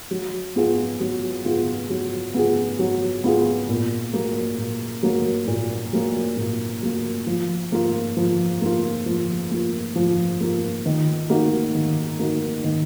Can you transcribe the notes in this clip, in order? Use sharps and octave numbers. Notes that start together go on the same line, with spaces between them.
F#3
B3 F4 G#4
F#3
B3 F4 G#4
F#3
B3 F4 G#4
F#3
B3 F4 G#4
A#2
F#3 A#3
A#2
F#3 A#3
A#2
F#3 A#3
A#2
F#3 A#3
F3
A#3 F4
F3
A#3 F4
F3
A#3 F4
F3
A#3 F4
D#3
A#3 D#4 F#4
D#3
A#3 D#4 F#4
D#3